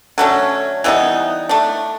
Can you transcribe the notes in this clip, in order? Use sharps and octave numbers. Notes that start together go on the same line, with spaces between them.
D3 F#3 A3 C#4
E3 G3 B3 D#4
A3 D4